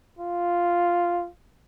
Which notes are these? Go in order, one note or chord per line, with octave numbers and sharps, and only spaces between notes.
F4